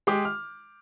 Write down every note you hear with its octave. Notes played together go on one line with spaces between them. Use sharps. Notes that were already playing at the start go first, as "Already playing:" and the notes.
G#3 G4 D6
F6